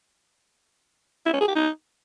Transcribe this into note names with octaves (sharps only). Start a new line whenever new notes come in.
E4
C#4
G#4
G4
D#4